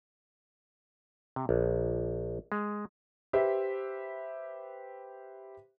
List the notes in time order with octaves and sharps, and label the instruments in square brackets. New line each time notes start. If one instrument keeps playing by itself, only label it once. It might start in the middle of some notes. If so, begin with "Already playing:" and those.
[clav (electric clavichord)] C3
A#1
G#3
[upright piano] G4 B4 C5 E5